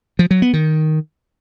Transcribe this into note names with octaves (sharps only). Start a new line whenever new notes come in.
F3
F#3
B3
D#3